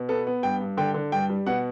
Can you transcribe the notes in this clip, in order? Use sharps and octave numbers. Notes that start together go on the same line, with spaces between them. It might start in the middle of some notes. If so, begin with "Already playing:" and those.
Already playing: B2
B3 A4
B3
G2 G5
G2
D3 G5
D3
G2 G5
G3
B2 F#5